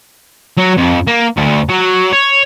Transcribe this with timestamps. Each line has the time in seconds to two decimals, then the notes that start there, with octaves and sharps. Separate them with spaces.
0.58 F#3
0.77 F2
1.07 A#3
1.37 D2
1.69 F#3
2.13 C#5